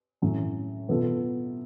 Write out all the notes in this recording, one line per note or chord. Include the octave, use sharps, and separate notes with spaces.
A2 F#3 C#4
B2 F#3 B3 F4 A4